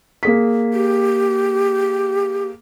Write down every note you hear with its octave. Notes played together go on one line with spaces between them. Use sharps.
A#3 G#4 B6
G4